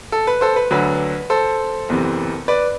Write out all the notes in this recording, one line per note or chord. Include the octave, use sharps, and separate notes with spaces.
A4
B4
A4 C5
B4
D2 D3 F#3 B4
A4 C5
F#1 E2 C3 E3
B4 D5